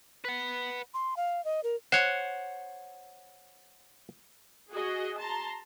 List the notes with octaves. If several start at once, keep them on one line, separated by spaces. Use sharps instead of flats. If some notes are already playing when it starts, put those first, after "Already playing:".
B4 F#5
C6
F5
D#5
A#4
C5 C#5 F#5
F#4 G#4 D#5
A5 A#5 C6